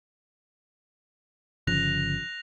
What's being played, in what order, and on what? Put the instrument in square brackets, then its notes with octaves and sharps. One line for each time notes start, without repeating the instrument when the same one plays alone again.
[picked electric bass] G1 C#3 F3 [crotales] F#6 A#6 F7